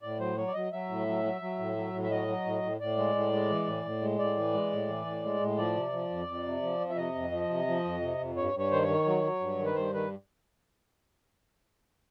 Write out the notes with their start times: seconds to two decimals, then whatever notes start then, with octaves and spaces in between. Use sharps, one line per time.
0.02 A2 D5
0.19 F#3 C5
0.37 F#3 C#5
0.47 D5
0.54 F#3 D#5
0.72 F#3 E5
0.89 A2
1.07 F#3
1.24 F#3
1.41 F#3
1.58 A2
1.76 F#3
1.93 A2
2.04 E5
2.11 F#3 D#5
2.28 F#3
2.46 A2
2.63 A2
2.80 A2 D5
2.97 G#3
3.15 A2
3.33 G#3
3.50 E3
3.67 A2
3.85 A2
4.01 G#3
4.19 A2 D5
4.37 E3
4.54 G#3
4.72 A2
4.88 E3
5.06 A2
5.24 G#3
5.40 A2
5.58 F3 D5
5.75 C3
5.93 F3
6.10 F2
6.28 F2
6.46 C3
6.62 F3
6.80 F2
6.90 E5
6.97 C3 D#5
7.15 F2
7.32 F3
7.49 C3
7.68 F3
7.85 F2
8.02 C3
8.19 F2
8.36 G2 C#5
8.54 G2 C#5
8.71 D#3 C5
8.82 C#5
8.88 D#3
9.06 F#3
9.24 F#3
9.40 G2
9.59 D#3
9.66 B4
9.75 G2 C5
9.93 D#3 B4